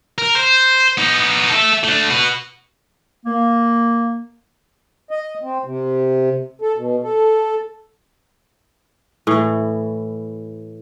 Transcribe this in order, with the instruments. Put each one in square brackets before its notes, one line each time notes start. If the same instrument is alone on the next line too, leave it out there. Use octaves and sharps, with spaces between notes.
[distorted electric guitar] A#4
C5
B3 D#4
A4 E5
A3 D4
F#4 B4
[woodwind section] A#3
[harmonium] D#5
C4
C3
A4
B2
A4
[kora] A2 E3